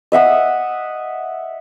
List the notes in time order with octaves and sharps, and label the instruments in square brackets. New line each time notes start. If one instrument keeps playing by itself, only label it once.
[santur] D#5 E5 F#5 D#6